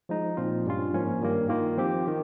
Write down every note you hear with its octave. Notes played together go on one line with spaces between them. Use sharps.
F3 G#3 D#4
A#2 F3 C4 F4
G2 G3 C#4 F4
G#2 F3 A#3 C#4
G2 D#3 G3 A#3
D#3 A#3 F4
F3 C4 G4
D#3